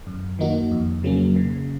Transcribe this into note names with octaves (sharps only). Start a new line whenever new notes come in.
F#2
D#3 A#3 D#4 F#4
F2
C#3 F#3 A#3 C#4
C#3